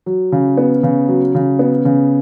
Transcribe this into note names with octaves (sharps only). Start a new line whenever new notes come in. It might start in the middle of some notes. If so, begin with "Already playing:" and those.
F#3
C#3
B3
C#3
F#3
C#3
B3
C#3